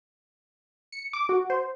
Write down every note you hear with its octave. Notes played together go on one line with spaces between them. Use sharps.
C#7
D6
F#4
C5